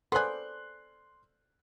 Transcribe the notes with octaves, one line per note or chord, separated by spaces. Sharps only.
B3 G#4 A4 C5 D5 C6 F#6